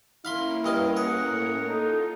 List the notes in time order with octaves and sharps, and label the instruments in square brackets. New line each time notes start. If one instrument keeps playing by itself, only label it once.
[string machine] A#3 C#4 A#4 [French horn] E4 [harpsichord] F5 B5 C6
[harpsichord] G2 D#5 F5
[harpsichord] G#4 [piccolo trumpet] F#5
[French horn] A2
[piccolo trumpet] D#4 [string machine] F4 [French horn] A4